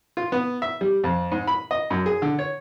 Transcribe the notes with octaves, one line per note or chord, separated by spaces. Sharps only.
F4
B3
E5
G3
F2
G#2
B5
D#5
F#2
G#4
D3
C#5